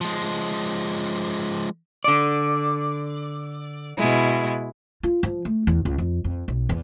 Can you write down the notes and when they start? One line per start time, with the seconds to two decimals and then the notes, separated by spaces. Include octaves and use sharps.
0.01 F3 G#3
2.04 D3 D5
3.98 B2 G#3 E4
5.03 F4
5.23 F3
5.45 A3
5.67 E2
5.85 C#2
5.98 F2
6.24 F2
6.48 B1
6.69 E2